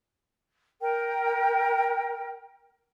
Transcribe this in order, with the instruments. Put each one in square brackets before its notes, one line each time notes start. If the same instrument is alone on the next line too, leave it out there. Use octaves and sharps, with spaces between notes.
[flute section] A#4 G5